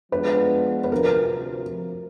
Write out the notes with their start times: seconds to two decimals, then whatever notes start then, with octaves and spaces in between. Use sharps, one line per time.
0.12 F3 G#3 B3 D4 B4
0.84 B4
0.91 D2 C3 F3 A#4